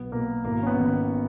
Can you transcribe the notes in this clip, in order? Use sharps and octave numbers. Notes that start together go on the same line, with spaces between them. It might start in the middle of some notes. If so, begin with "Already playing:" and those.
Already playing: B1 B3
B2 A#3
G#1 A#3
C#4
B3
D#3